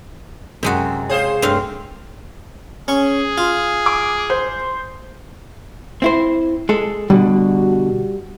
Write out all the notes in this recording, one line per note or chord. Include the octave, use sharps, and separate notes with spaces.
F#2 C3 G#3 F#4
G#4 C5 C#5 F5 G#5
G2 A3 C4 C#5 F5
C#4 G#4 C#6
F4
D6
C5
C4 E4 C5
G#3 A4
B2 D3 G3 F#4